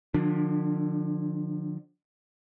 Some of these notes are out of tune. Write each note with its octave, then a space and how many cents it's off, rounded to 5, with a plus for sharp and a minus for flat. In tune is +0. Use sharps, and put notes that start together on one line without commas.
D3 +40 F3 +35 D4 +0